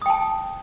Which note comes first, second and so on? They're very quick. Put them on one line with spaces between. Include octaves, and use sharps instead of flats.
D#6 G5 A5